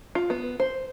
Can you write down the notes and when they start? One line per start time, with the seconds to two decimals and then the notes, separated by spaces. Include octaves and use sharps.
0.15 F4
0.30 B3
0.60 C5